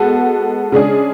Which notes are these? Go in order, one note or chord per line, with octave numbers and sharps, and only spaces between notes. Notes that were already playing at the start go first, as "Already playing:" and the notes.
Already playing: G#3 B3 F#4 A4
C#3 G#3 D4 G#4